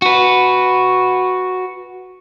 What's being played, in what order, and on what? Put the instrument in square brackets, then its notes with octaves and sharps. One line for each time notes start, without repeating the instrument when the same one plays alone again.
[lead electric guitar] F#4 B4